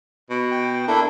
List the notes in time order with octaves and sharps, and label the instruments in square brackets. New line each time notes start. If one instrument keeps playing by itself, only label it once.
[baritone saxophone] B2
[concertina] G5
[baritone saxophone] A#3 [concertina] D4 E4 A4